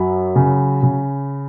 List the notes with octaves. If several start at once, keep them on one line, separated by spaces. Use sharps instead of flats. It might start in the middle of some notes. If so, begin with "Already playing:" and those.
Already playing: F#2 F#3 B5
C#3
C#3